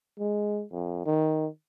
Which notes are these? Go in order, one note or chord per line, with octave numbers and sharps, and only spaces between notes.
G#3
F2
D#3